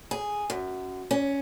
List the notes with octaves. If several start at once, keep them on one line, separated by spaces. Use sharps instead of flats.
G#4
F#2
C#4